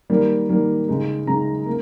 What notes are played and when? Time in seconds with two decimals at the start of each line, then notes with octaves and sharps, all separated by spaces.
0.10 D#3 G3 A#3
0.49 D#3 G3 A#3
0.88 C#3 G#3 D#4
1.27 C#3 G#3 D#4 A#5
1.66 A#3